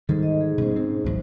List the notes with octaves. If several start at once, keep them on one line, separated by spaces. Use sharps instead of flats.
G#2 D#3 G3 G#3 A4
D#5
G#4
B2 G3 G#3 C#4 G#4 C5
C4
A1 D2 A2 F#3